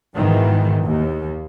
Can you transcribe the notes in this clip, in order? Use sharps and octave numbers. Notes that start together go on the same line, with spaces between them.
G#2 B2 D#3 E3
D#2